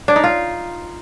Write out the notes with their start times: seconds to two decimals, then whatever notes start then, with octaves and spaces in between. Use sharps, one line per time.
0.08 D4
0.16 D#4
0.24 F4